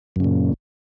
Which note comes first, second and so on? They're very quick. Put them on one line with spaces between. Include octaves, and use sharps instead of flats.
F#2 C#3 A#2